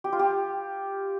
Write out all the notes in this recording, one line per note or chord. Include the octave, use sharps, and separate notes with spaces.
G4
F4
G4